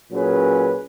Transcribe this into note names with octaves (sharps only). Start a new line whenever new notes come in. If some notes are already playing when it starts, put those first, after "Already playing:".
A#2 F#3 C#4 G#4 B4